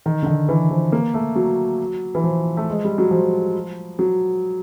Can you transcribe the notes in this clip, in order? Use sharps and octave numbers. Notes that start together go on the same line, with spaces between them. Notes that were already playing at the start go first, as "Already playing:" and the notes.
D#3
D3
D#3
E3
F3
A#3
A3
F#3
E3
F3
A3
G#3
G3
F#3
F3
F#3